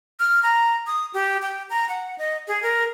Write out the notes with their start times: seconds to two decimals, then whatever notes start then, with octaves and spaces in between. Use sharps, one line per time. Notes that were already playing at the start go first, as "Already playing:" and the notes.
0.20 F6
0.43 A#5
0.87 D#6
1.14 G4
1.42 G5
1.70 A#5
1.89 F#5
2.18 D#5
2.48 G#4
2.62 A#4